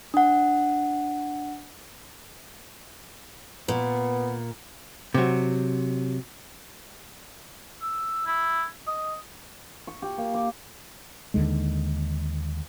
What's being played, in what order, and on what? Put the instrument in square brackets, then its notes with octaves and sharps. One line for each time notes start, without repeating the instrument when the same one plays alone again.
[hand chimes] D4 F#5
[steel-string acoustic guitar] A#2 [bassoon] B3
[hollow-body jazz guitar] C3 F#3
[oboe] E6
E4
D#5
[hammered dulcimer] C#6
G4
A#3
D6
[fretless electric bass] D#2 D3 D#3 G#3